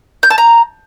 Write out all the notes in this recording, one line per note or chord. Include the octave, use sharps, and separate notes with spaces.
G6
A5
A#5